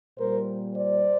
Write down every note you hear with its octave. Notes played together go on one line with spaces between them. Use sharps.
A#2 G3 A#4 C5
C5 D5